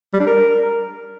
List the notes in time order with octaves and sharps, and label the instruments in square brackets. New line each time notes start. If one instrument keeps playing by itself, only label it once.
[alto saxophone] G3
D4
A#4